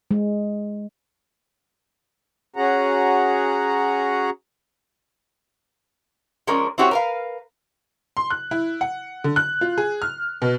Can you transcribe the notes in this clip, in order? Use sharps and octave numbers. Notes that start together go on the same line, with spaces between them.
G#3
C#4 F#4 G#4 F#5 A#5
F3 G#3 C#4 D4 A#4
C4 E4 F#4 G4 C#5
A#4 B4 F5
C6
F#6
E4
F#5
D3
F#6
F4
G#4
F6
B2